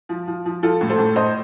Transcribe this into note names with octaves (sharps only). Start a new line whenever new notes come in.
F3
F3
F3
F3 F4 A4
A2
A4 C5
A2
A2 C5 D#5